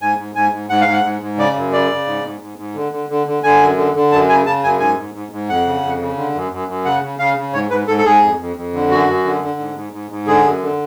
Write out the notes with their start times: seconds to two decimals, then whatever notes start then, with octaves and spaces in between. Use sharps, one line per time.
0.02 G#2 G#5
0.18 G#2
0.35 G#2 G#5
0.52 G#2
0.69 G#2 F#5
0.81 F5
0.87 G#2
0.93 F#5
1.04 G#2
1.22 G#2
1.38 C#3 D5
1.56 F#2
1.73 C#3 D5
1.90 C#3
2.06 G#2
2.24 G#2
2.40 G#2
2.58 G#2
2.75 D3
2.93 D3
3.09 D3
3.27 D3
3.43 D3 G#5
3.61 F#2
3.77 D3
3.95 D3
4.12 F#2 A5
4.29 C#3 G#5
4.46 C#3 A5
4.64 F#2 G#5
4.80 G#2 G#5
4.97 G#2
5.14 G#2
5.32 G#2
5.49 F2 F#5
5.66 C#3
5.83 F2
6.00 C#3
6.17 D3
6.35 F#2
6.52 F#2
6.68 F#2
6.85 C#3 F#5
7.03 C#3
7.19 C#3 F5
7.37 C#3
7.53 G#2 C#5
7.70 G#2 B4
7.87 G#2 A4
7.98 A4
8.06 G#2 G#4
8.22 F2
8.40 F2
8.56 F2
8.74 D3
8.90 F#2 F#4
9.07 F#2
9.25 D3
9.42 D3
9.59 G#2
9.75 G#2
9.93 G#2
10.11 G#2
10.27 D3 G#4
10.45 F#2
10.62 D3